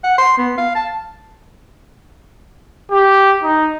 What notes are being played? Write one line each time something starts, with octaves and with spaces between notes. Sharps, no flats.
F#5
C6
B3
F5
A5
G4
D#4